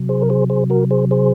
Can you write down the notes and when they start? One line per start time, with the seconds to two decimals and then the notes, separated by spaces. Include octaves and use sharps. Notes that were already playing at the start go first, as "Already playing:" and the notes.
Already playing: C3 F#3
0.09 G#4 C5
0.21 A#4
0.30 G#4 C5
0.50 G#4 C5
0.70 F#4 A#4
0.91 G#4 C5
1.11 G#4 C5